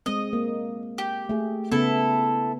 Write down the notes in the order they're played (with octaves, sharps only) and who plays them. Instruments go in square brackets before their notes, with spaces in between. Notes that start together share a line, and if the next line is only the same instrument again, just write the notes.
[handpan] G#3 C4 [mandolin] D#5
[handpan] A#3
[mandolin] G4
[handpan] A3 G#4
[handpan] C#3 B3 [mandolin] E4 A4